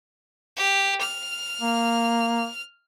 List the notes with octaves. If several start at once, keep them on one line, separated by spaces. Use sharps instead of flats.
G4
F6
A#3